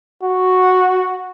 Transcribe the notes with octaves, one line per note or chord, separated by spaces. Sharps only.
F#4